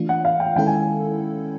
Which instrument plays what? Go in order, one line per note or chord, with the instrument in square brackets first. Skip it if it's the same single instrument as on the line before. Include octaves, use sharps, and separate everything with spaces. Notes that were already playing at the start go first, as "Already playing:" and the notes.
Already playing: [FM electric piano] E3 A3 D4 F4
[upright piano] F#5
F5
G5
[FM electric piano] D#3 G#3 C#4 E4 A4 [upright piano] G5
[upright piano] G#5